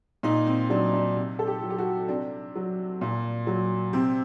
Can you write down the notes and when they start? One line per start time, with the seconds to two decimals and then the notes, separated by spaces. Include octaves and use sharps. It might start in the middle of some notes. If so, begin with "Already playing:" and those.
0.23 A#2 D#4
0.47 C4
0.70 F#3 D4
0.94 D4
1.16 C3
1.39 A4
1.47 G4
1.63 F#3
1.71 G4
1.78 F#4
2.08 C3 D4
2.56 F#3
3.01 A#2
3.47 F#3
3.93 C3 C4